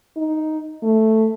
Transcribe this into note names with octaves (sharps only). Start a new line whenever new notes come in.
D#4
A3